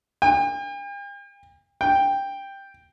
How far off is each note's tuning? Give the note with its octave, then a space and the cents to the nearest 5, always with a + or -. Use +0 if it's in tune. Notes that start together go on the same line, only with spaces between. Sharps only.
G5 +45
G5 +5